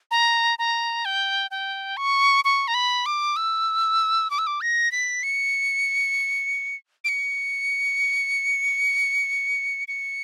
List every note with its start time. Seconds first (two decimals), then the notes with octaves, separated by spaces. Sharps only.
0.11 A#5
0.59 A#5
1.05 G5
1.51 G5
1.97 C#6
2.45 C#6
2.68 A#5
2.74 B5
3.06 D6
3.36 E6
4.30 D6
4.39 E6
4.47 D6
4.61 A#6
4.92 B6
5.23 C#7
7.05 D7
7.09 C#7
9.88 C#7